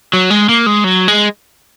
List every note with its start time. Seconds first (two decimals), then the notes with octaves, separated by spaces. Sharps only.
0.13 F#3
0.30 G#3
0.49 A#3
0.66 G#3
0.84 F#3
1.08 G#3